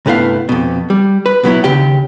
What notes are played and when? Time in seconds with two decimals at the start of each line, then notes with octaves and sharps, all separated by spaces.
0.06 C2 G2 A3 B3 E4 F5
0.49 F2 B2
0.90 G3
1.26 B4
1.43 B2 F#3 B3 E4
1.64 D#2 C#3 G4 G5